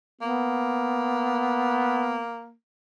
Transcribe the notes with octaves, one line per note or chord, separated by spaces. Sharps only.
A#3 B3